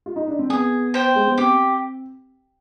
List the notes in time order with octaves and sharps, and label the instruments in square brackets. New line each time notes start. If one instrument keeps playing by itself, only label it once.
[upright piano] F4
D#4
D4
C4
[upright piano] B3 [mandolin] G#4
[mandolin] C5 G5
[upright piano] G#3
B3
[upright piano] C4 [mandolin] G4